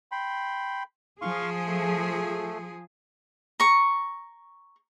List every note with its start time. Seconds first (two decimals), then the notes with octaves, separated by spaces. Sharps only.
0.12 G5 B5 C6
1.21 F3 G#4 F5 C6 C#6
1.66 A3
3.60 A#5 C#6